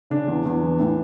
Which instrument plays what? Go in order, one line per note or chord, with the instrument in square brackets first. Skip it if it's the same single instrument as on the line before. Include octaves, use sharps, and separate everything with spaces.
[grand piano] C#3 D4
E2
E2
E3
A2